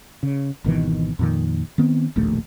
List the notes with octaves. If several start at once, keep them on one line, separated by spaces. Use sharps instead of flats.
C#3
G#1 B2 D#3 E3
F2 A#2 D#3
D#3 B3 C4
E1 A#1 D#2 A3